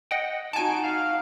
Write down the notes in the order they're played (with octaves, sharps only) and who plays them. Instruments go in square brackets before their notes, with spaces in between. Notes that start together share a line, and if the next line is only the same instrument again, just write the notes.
[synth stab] D#5 F#5 G5
[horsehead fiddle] D#4 F#4 [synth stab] G#5 A5 [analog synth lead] D7
[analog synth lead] F5